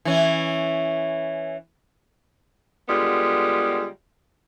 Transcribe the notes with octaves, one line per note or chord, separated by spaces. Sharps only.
E3 C#4
D3 G3 G#3 B3 F4